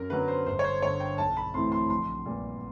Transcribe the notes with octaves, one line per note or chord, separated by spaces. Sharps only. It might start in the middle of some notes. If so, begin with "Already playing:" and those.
Already playing: F#2 A#4
D3 F#3 B3 B4
C5
G1 C5
C#5
C5
G2 D3 C#5
G5
B1 A5
B5
A2 E3 A3 C4 C6
C6
A#1 C6
A#2 G3 B3